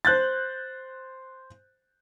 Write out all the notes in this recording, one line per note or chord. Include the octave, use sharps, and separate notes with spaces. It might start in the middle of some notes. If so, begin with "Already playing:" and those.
C5 F#6 G6 A6